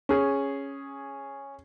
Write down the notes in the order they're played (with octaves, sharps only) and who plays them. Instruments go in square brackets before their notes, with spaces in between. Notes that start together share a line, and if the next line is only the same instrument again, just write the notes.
[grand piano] C#4 G#4